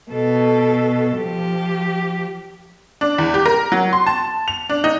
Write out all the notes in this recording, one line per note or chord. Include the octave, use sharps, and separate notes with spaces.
B2 A4
F3 G4
D4
E2
G4
A#4
F#3
C6
A5
F7
D4
D#4